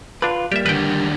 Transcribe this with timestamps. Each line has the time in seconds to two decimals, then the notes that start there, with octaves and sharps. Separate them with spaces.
0.22 D3 D4 F4 B4
0.52 G3 A#3 G4 E5
0.66 D#2 D3 B4 G5